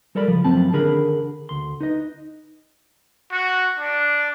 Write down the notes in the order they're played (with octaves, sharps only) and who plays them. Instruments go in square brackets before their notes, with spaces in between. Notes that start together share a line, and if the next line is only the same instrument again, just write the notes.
[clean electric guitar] G3 A4 A#4 D5 B5
C#2 F3
F#2 F3 A3 C4 A5 B5
D3 D#3 D4 G#4 A#4 B5
D2 C6
D#4 B4 D#5
[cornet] F#4
D4